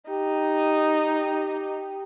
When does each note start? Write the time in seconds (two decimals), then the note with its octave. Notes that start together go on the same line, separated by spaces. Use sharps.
0.10 D#4 G4